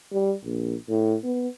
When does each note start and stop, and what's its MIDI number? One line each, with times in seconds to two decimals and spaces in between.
0.13 0.33 55
0.44 0.75 34
0.89 1.16 45
1.24 1.47 59